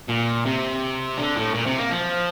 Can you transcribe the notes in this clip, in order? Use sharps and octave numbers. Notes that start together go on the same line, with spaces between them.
A#2
C3
D3
A2
A#2
C3
A#3
F3